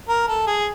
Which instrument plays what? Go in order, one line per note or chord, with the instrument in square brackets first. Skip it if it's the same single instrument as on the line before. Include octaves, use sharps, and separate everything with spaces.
[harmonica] A#4
A4
G#4